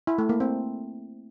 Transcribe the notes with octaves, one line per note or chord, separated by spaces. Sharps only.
E4
A3
A#3
C4